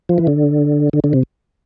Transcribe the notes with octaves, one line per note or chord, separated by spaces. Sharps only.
F3
E3
D3
D3
D3
C3